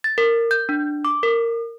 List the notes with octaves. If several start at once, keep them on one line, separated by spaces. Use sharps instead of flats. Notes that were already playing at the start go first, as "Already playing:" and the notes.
A6
A#4
G6
D4
D6
A#4